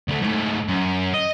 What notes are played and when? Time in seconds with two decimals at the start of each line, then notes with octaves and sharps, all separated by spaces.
0.08 D2 A3
0.22 G#2 A3
0.68 F#2
1.14 D#5